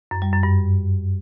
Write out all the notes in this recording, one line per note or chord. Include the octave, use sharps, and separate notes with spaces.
F#2
G3
F#2
G2